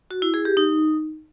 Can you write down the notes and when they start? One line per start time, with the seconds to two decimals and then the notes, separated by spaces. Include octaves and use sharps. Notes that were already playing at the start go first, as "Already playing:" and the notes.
0.11 F#4
0.22 E4
0.34 G#4
0.45 G4
0.57 D#4